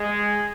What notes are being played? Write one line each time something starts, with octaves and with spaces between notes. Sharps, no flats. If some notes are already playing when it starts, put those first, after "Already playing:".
Already playing: G#3 G#4